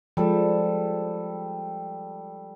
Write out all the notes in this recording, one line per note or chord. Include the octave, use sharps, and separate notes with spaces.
F3 G3 G#3 A4